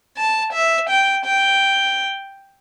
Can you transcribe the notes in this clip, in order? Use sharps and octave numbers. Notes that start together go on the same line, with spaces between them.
A5
E5
G5
G5